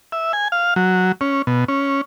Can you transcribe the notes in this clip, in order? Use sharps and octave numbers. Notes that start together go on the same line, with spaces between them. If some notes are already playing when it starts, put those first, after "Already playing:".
E5
G#5
F5
F#3
C#4
B2
C#4